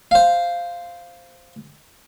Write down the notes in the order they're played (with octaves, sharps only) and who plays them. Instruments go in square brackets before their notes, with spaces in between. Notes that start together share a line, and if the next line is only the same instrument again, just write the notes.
[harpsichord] C5 F5